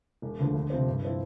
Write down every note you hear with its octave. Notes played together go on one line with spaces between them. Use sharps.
E1
D2 D3 F3 A3
D2
C3 F3 C4
G2
F3 C4 E4